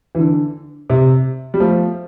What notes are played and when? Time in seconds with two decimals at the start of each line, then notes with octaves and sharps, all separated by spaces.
0.15 E3
0.19 D3
0.90 C3
1.54 G3
1.60 F3 A3